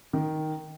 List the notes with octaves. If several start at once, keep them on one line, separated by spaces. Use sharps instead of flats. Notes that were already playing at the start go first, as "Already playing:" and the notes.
D#3